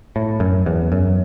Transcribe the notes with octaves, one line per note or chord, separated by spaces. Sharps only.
A2
F#2
E2
F#2